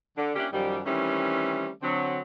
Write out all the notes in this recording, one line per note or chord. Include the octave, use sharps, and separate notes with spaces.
D3
A#3 C#4 D4 E4 G4
F#2 D#3 F3 G3
D#3 E3 G3 A3 C4 C#4
D3 F#3 C4